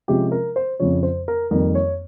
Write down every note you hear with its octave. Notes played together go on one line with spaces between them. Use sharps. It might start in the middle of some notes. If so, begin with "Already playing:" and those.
C3 F3 G#3 C#4 G4
A#4
C5
F2 C#3 F3 C#5
C5
A#4
F2 D#3 G3 A#3 A#4
C#5